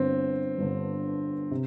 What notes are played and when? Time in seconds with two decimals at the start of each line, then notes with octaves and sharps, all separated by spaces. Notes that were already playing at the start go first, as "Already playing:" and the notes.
Already playing: G1 G2 D3 C4
0.58 G1 G2 D3
1.51 C3